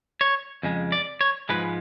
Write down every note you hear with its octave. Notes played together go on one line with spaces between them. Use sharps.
C#5
F2 C#3 G#3
D5
C#5
G#2 F3 G#3 B4